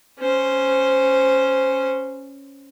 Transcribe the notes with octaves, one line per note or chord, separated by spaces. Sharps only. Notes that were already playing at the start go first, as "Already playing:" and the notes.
C#4 C5